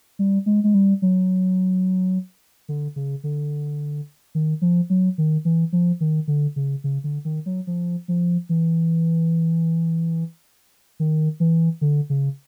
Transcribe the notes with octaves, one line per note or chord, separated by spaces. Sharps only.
G3
G#3
G#3
G3
F#3
D3
C#3
D3
D#3
F3
F#3
D#3
E3
F3
D#3
D3
C#3
C#3
D3
D#3
F#3
F3
F3
E3
D#3
E3
D3
C#3